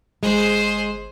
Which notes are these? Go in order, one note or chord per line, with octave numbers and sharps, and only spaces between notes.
G1 G#3 G#4 C5